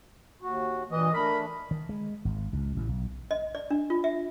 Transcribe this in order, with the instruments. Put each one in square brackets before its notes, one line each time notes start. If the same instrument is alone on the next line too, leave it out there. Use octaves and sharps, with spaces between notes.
[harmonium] D#2 F#4
[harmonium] G2 A#2 [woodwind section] E3 D#5
[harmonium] A3 D4 [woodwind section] A#4 B5
[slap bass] D#3
G#3
G#1
C#2
A1
B1
[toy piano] D#5
D5
D4
F4
E5